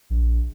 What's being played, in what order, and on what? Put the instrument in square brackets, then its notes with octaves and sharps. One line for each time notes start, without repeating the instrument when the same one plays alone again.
[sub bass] A#1